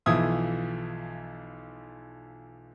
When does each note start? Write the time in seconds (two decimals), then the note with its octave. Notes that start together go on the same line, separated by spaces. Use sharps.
0.06 B1 E3 F3 E5 D#6 G#6